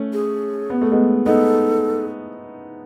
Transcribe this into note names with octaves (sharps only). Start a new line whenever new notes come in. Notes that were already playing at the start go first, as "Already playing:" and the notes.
Already playing: A3 C#4
G#4
B3
A3
G#3 B3
B3 D#4 A4